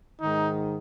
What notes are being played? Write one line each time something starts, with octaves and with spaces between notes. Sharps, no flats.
G#2 D#3 D#4